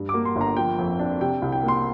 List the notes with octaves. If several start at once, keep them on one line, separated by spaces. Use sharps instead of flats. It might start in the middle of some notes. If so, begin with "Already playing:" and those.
Already playing: G2
D6
A#3
C6
G1
A#5
F3 G5
F2
D4
C3 G5
C2
G5
A#3
C6